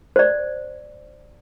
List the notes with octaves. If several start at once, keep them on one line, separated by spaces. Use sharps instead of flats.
C5 D5